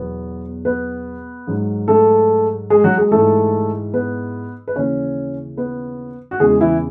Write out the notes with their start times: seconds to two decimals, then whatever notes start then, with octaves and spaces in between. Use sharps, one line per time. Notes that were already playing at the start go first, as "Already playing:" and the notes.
Already playing: E2 B2 F#3 B3 B4
0.65 B3 B4
1.47 G#2 F#3
1.88 A3 A4
2.70 G#3 G#4
2.84 F#3 F#4
2.97 G#3 G#4
3.11 G#2 E3 A3 A4
3.94 B3 B4
4.68 B4
4.76 D#2 C#3 E3 C#4 C#5
5.57 B3 B4
6.31 F#4
6.40 E2 C#3 E3 G#3 G#4
6.60 E3 E4